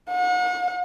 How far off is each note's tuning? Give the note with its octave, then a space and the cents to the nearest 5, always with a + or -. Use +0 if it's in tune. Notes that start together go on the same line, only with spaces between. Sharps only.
F#5 -40